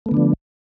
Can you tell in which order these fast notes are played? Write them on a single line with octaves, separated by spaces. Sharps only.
A3 B3 D3 D4 F3